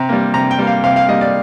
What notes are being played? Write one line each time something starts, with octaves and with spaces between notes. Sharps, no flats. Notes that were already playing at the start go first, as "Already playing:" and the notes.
Already playing: C3 A#5
G3 A#3
C3 A#5
G5
G3 A#3
F5
C3 F5
F5
G3 A#3 D#5
D5